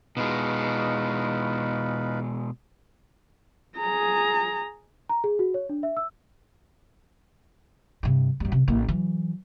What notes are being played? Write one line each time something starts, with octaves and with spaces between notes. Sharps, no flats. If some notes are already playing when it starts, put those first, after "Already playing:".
B2 G#3 D#4 F4 B4
G#4 A#5
A#5
G#4
F#4
C#5
D4
E5
E6
G2 C3
F#2 G3
C3
A1 A#3
E3 F#3